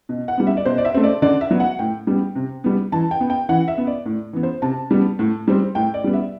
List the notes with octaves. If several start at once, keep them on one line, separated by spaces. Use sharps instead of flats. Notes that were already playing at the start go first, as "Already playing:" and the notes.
B2
F#5
G3 B3
E5
D5
B2 C5
D5
E5
A3 C4
D5
D3 D5
E5
F#3 B3
F#5
A2 G5
G3 B3
C3
G3 B3
E3 A5
G5
B3
G5
E3 F#5
E5
B3
D5
A2
E3 B3
C5
C3 A5
G3 B3
A2
G3 C4
A2 G5
D5
G3 B3
E5